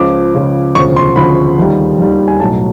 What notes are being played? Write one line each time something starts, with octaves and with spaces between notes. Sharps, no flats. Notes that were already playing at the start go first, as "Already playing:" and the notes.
Already playing: C#2 C#3 F3 D6
C#2 C#3 F3
E1 D2 C#3 F3 C#6
C6
E1 D2 C#3 F3 B5
D#2 D#3 G3
D#2 D#3 G3
G#5
B1 A2 F#3 A5